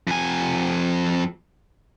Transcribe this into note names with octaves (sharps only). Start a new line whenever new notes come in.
F2 G#5